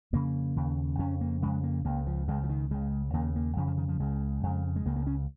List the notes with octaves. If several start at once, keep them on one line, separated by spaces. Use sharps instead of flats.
F2 C#3 A#3
D#2 C#3
F2 C#3 C#4
A#3
F2 C#3 G#3
A#3
C#2 C#3 A#3
F3
C#2 C#3 G#3
F3
D#3
C#2 C#3 G#3
D#2 C#3 A#3
A#3
F2 C#3 F3
F3
D#3
F3
C#2 C#3 G#3
F2 C#3
G#3
C#2 C#3 A#3
A#3
C#4